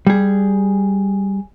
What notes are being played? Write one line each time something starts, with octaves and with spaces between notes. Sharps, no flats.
G3 G#4